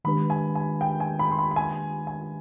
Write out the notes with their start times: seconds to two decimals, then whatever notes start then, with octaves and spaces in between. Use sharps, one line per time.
0.05 D#3 G#3 D4 G4 B4 B5
0.30 G#5
0.55 G#5
0.81 G5
1.00 G#5
1.19 B5
1.31 C6
1.39 B5
1.51 B5
1.56 G#5
2.07 G#5